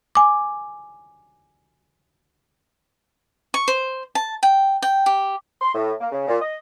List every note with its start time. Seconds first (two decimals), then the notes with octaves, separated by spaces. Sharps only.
0.15 G#5 D6
3.54 C#6
3.68 C5
4.15 A5
4.43 G5
4.82 G5
5.06 G4
5.62 C6
5.74 A2
6.00 A#3
6.12 C#3
6.28 A#2
6.41 D#5